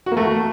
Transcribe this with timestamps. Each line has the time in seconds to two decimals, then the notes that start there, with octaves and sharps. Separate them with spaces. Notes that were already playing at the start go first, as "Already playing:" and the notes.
0.06 F#4
0.12 A#3
0.17 A3